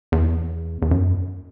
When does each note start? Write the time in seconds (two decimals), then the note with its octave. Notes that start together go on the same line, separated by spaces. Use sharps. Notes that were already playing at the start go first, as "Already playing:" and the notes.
0.12 E2
0.82 E2
0.91 F#2